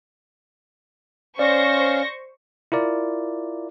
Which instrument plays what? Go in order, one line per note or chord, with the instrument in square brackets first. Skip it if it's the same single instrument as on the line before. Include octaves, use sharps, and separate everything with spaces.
[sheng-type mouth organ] C#4 F5 [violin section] C5 C#6 A#6 [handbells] D5
[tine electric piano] E4 F4 A#4 D5